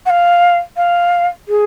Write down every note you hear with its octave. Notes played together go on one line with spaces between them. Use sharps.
F#5
F5
F5
G#4